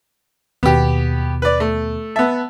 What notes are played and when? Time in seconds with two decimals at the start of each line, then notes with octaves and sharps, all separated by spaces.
0.63 D#2 B2 B3 G4
1.42 B4 D5
1.60 A3
2.16 B3 E5 F#5 A5